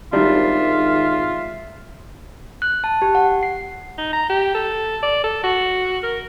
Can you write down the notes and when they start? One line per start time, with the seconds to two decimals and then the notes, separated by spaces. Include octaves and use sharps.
0.13 G#1 G3 D4 D#4 F4 E5
2.62 F#6
2.84 A5
3.02 G4
3.15 F#5
3.43 C7
3.98 D#4
4.13 A#5
4.29 G4
4.55 A4
5.03 D5
5.24 A4
5.44 F#4
6.03 A#4